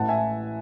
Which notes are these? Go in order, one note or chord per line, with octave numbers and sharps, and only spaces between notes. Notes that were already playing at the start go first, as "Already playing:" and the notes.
Already playing: A1 A2 E3 F#5 A5
E5 G#5